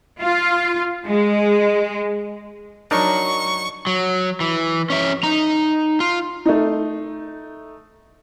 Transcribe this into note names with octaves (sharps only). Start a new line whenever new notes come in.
F4
G#3
F#3 D4 D#4 A#4 A#5 C#6
F#3
E3
C#4 E5
D#4 A#5
F4
A3 D#4